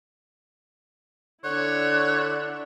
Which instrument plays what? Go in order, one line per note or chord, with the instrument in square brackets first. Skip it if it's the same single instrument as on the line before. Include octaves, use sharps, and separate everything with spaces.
[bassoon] D3 [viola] D4 E4 [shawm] C#5 [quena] F#6